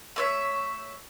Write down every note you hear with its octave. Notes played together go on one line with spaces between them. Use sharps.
A3 C#5 E5